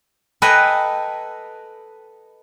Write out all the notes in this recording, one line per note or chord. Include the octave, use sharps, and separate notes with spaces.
A4 B4 D#5 G5 G#5 A#5